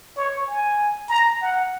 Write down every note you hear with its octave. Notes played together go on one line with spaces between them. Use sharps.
C#5
G#5
A#5
F#5